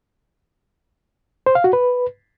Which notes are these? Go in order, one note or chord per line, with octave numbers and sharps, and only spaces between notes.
C5
F5
F#4
B4